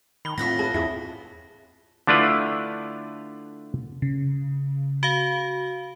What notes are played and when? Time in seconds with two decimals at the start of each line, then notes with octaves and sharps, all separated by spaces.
0.25 D#3 B5 G7
0.38 A2 B3 C4 F4 A#6 B6
0.59 G#4 B4 A5
0.74 E2 E4 G#4
2.07 D3 A3 D4 E4 F4 B4
4.02 C#3
5.03 F#4 F5